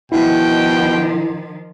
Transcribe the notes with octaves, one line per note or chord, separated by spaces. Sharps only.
B2 D#3 F3 E4 G5